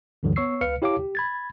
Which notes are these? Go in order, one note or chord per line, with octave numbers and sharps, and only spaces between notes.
D2 G2 D3 E3 F#3
B3 C#5 C#6 E6 C7
C#2 B4 F5 F6 C#7
E4 G4 C#5 F5 A5 D6
G4
B5 G#6 A6